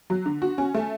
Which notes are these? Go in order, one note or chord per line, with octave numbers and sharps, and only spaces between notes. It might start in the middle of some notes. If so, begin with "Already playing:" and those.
F#3
D3
F#4
C#4
A3